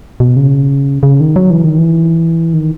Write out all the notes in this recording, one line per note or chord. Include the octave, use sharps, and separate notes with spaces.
B2
C#3
C#3
D#3
F#3
E3
D#3
E3
D#3